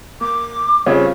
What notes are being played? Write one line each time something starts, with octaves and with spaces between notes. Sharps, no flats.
A#3 D6
C#3 G3 C4 C#4 F4 C#5